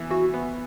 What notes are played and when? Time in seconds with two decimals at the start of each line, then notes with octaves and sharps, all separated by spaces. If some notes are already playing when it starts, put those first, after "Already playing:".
Already playing: E3 B3
0.10 E3 F#4
0.34 B3